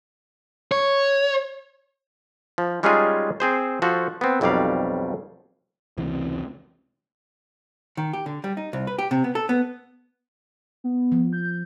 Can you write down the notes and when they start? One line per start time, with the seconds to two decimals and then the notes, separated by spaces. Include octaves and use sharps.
0.72 C#5
2.58 F3
2.83 G3 G#3 C#4 D#4 F4 G#4
3.40 C4 G#4 C5
3.82 F3 F#4 A4 C5
4.21 B3 C4
4.41 B1 F2 F#3 G3 D5 F5
5.97 F1 C#2 C3 E3
7.97 D#3
8.13 G4
8.26 D3
8.44 G3
8.57 D#4
8.73 C2
8.87 B4
8.98 G4
9.11 C3
9.24 B3
9.35 A4
9.49 B3
10.84 B3
11.12 F3
11.33 G6